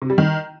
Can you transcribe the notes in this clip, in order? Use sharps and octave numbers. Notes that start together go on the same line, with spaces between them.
C3
G3
D#3